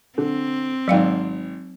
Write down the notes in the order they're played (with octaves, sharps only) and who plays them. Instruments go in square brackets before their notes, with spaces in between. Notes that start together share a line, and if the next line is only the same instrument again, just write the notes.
[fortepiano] D3 [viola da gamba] C4
[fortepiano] G#1 D5 [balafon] F#3 F5 G5